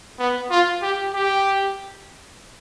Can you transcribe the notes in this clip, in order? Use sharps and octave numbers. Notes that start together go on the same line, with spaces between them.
B3
F4
G4
G4